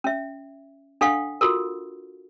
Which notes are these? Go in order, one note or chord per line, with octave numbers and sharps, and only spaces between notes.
C#4 E5
D4 A4 F5 F#5 C#6
F4 F#4 A4 A#4